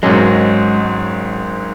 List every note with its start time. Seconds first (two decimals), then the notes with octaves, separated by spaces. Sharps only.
0.03 G#1 G#2 F#3 G#3 C#4